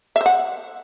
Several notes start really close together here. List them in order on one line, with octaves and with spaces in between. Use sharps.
E5 C5 F#5